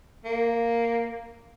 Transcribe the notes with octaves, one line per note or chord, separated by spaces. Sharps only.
A#3